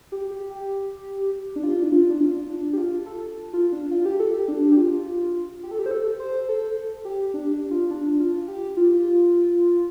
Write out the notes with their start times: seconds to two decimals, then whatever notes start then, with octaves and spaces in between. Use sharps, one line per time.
0.12 G4
0.31 G4
0.50 G4
1.56 D4
1.63 F4
1.83 D4
1.92 F4
2.10 D4
2.21 F4
2.50 D4
2.73 G4
2.78 F4
3.06 A4
3.53 F4
3.72 D4
3.91 F4
4.01 F4
4.05 G4
4.20 A4
4.34 G4
4.48 D4
4.72 G4
4.77 F4
5.63 G4
5.71 A4
5.79 G4
5.86 C5
5.91 A4
6.19 C5
6.49 A4
7.05 G4
7.34 D4
7.53 D4
7.71 F4
7.91 D4
8.20 F4
8.48 G4
8.77 F4